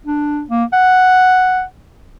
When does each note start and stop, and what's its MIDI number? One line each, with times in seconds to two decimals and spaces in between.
0.06 0.42 62
0.50 0.64 58
0.73 1.63 78